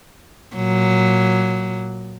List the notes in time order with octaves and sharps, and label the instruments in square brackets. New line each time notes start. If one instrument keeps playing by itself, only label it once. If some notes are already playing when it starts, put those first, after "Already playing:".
[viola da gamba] A#2 F#3